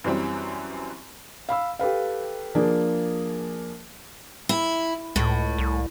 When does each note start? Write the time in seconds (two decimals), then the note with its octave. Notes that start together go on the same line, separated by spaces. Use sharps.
0.04 F#2 E3 F#3 G3 C4
1.49 F5 B5 E6
1.79 G4 A4 B4 F5
2.55 F3 A#3 D4 G#4
4.49 E4
5.16 C#2 A2
5.58 C2